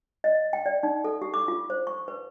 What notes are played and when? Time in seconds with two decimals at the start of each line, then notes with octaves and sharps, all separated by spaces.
0.24 D#5
0.53 G5
0.66 D5
0.83 D#4
1.05 A4
1.22 G4
1.34 D6
1.48 F4
1.70 C5
1.87 C#6
2.08 B4